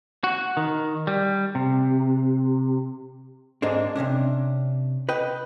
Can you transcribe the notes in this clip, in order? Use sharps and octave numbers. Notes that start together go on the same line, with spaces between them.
F#4
D#3
G3
C3
G#2 G#3 A#3 C4 D4
C3 A#3 C#4 D4
B4 D#5 G5